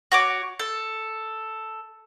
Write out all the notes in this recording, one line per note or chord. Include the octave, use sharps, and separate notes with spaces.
F#4 C#5 D6
A4